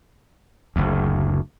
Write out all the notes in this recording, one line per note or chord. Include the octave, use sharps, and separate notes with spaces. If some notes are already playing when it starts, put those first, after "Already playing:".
F#1 D2